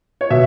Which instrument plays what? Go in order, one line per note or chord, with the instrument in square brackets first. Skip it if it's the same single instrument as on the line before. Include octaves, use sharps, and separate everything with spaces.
[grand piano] C#5
B2 E5